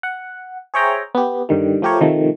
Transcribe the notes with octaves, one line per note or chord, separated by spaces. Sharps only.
F#5
G#4 C5 C#5 E5 G5 A#5
B3 G4
G2 D3 D#3 G3
F3 A3 G4 A#4 C#5
C3 D#3 F3 A3